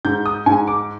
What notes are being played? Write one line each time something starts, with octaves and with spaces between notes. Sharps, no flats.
G#2 G6
D#6
G#2 G#5
D6